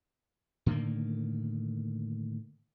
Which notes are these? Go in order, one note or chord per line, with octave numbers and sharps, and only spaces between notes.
A2 D3 D#3 A#3